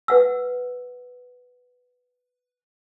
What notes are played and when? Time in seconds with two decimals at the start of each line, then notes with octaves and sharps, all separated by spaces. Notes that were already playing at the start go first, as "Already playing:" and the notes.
0.08 B4 F#5 E6